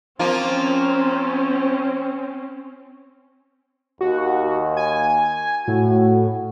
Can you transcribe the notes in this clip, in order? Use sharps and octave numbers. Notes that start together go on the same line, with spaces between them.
F3 A#3 C4 C#4 F4
D#2 F#4
G#5
A2 F#4